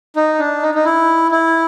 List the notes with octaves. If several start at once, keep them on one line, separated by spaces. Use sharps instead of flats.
D#4
D4
D#4
D#4
E4
E4